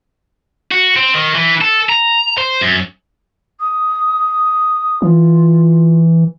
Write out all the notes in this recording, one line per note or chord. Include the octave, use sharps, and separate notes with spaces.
F#4
C4
D#3
E3
A4
A#5
C5
F#2
D#6
E3 F4